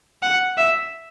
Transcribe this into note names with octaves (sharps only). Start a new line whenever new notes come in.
F#5
E5